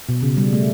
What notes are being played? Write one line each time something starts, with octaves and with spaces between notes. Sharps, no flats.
B2
C#3
G3
A3